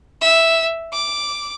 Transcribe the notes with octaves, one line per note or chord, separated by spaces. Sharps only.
E5
D6